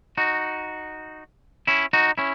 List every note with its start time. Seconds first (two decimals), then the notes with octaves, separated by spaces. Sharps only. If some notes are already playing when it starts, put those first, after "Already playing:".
0.17 D#4 F#4
1.67 C#4 E4
1.93 D#4 F#4
2.18 C#4 E4